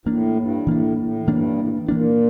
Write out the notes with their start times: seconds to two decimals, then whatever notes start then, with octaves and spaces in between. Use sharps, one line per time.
0.06 A2 E3 A#3 D4
0.37 G2
0.67 A2 E3 A#3 D4
0.89 G2
0.98 A2
1.27 G2 E3 A#3 D4
1.58 A2
1.68 G2
1.79 A2
1.89 A#2 E3 A#3 D4